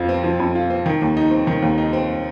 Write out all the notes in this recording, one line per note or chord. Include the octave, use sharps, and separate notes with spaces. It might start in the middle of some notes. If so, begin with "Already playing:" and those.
Already playing: F2 F3 F4
C4
F3
F2
F4
C4
D#3
D#2
D#4
C4
D#3
D#2
D#4
C4